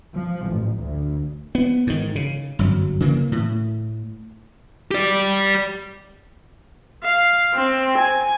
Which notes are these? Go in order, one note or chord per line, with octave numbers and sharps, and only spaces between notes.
F3
A1
D2
B3
G#2 D#3
C#3
G1 F#2 F#3
C#3 E3 G3 A#3
A2
G4 D5
F5
C4
G#5